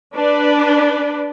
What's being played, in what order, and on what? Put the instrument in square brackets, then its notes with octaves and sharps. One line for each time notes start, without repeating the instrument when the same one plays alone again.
[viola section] D4 B4 D5